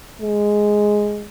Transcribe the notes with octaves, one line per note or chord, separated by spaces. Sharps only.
G#3